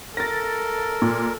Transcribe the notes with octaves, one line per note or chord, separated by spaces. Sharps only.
A4 A#4 A6 A#6
A#2